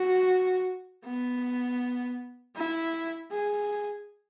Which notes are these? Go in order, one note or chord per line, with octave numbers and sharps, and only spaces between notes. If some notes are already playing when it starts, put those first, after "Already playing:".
Already playing: F#4
B3
E4
G#4